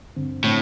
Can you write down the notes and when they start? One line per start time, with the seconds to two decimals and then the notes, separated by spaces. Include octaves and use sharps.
0.16 G2 D3 C4
0.44 A2 D3 C4